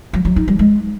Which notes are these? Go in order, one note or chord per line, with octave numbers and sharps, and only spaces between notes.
F#3
F#3
D#4
G3
G#3